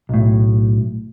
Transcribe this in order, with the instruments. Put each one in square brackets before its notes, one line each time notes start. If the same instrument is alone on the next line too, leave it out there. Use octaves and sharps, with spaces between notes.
[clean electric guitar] B1 A2